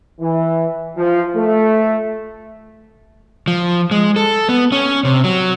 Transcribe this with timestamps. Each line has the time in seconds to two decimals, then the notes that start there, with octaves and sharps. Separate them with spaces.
0.20 E3
0.97 F3
1.36 A3
3.48 F3
3.91 G#3
4.16 A4
4.49 B3
4.72 C#4
5.05 C3
5.24 F#3